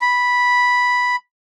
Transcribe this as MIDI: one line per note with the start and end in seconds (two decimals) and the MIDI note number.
0.02 1.16 83